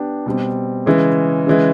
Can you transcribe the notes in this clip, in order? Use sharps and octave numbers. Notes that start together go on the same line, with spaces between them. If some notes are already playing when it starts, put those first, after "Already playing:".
Already playing: B3 D4 G4
B2 G3 C4
C#3 E3 G#3
C#3 E3 G#3